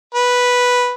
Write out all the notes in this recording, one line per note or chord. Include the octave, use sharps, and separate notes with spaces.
B4